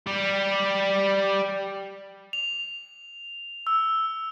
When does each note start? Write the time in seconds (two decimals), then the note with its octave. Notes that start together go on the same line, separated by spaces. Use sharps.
0.07 G3 G4
2.33 F7
3.67 E6